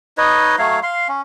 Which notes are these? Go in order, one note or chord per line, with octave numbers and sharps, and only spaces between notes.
D#4 B4 C#5 D#5
F#3 A3 C#5 F5
F5 C6
C#4